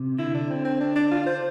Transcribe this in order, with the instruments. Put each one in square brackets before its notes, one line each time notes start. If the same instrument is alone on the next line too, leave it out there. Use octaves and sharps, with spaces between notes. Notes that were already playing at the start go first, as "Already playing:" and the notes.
Already playing: [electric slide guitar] C3
[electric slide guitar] D3 [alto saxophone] E4
[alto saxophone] D4
C4
C4
D4
D4
F4
C5